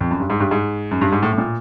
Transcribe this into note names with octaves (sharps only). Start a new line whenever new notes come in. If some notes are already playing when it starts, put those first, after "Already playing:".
F2
F#2
G2
G#2
G2
G#2
F#2
G2
G#2
A2
A2
A#2